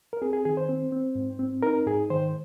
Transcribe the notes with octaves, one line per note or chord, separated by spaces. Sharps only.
A#4
C4 G#4
G#4
D#3 G#4
C5
C4
C4
G#2
C4
D#4 A#4
G#2 G#4
D#3 C5